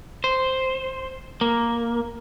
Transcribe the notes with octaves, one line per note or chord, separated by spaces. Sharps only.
C5
A#3